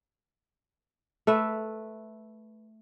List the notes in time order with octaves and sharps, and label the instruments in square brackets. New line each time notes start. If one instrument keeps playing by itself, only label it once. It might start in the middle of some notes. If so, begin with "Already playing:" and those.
[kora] A3 B4 E5